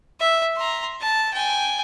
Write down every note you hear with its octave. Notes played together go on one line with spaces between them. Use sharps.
E5
A#5 C6
A5
G5 G#5